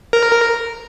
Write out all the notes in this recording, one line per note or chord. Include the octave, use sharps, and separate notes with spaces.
A#4